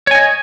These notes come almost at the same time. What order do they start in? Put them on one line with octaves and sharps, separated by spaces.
C#5 G#5 D#5